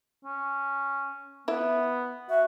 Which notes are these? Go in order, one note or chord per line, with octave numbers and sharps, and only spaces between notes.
C#4
B3 E4 E5
F#4 E5